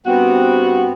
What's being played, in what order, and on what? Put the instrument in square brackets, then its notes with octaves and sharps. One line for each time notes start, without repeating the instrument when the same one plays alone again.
[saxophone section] G2 F#4 [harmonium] B3 C4